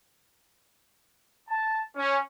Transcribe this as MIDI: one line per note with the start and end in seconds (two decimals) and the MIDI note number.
1.49 1.80 81
1.97 2.17 61